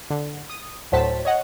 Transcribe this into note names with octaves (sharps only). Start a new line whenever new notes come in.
D3
D#6
D2 A2 F#3 C5 A5 B6
C#5 D#5 F#5